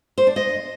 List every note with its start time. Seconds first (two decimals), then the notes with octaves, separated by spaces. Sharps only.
0.18 C5
0.27 D4
0.36 D#5